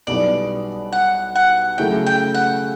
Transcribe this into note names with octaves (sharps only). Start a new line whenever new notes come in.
B1 B2 G3 B3 E4 D5
F#5
F#5
C#3 F#3 A3 E4 G5
G5
F#5